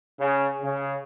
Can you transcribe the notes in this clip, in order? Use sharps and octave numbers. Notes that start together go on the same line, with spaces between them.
C#3
C#3